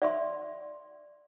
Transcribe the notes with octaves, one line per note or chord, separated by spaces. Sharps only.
D5 E5 C6